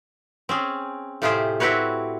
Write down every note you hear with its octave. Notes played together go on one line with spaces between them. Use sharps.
C4 C#4 G#4
A2 C3 F4 G4 G#4 C5
C4 E4 F#4 G4 B4 C#5